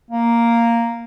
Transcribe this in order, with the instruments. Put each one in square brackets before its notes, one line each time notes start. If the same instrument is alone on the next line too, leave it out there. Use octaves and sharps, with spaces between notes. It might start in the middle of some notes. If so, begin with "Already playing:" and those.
[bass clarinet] A#3